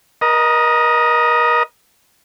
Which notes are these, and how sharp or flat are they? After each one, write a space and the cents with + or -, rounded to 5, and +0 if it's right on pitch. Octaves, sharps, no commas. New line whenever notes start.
A#4 +35 D#5 +0 A#5 -20